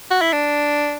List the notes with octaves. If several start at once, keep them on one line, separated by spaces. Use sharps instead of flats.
F#4
E4
D4